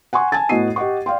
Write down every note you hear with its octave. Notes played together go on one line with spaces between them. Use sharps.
F#5 G#5 C6 C#6
G#5 A5 G#6 A6
A2 B3 F#4 D#5 C7 D#7
G4 D#5 F#5 C#6
D5 F5 G5 C6